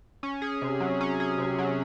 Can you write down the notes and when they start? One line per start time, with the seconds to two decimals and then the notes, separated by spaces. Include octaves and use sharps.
0.23 C#4
0.42 G#4
0.62 C3
0.80 F#3
1.01 C#4
1.20 G#4
1.38 C3
1.59 F#3